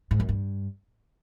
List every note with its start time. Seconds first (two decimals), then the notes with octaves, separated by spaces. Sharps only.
0.11 G#2
0.20 F#2
0.29 G2